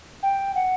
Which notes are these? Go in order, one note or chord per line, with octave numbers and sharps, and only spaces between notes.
G5
F#5